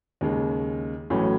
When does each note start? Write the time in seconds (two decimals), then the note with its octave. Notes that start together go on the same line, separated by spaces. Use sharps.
0.21 D#2 C#3 G#3
1.10 A1 A2 F#3 C#4